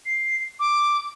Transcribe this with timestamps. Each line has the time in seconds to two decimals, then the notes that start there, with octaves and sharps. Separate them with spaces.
0.06 C7
0.60 D6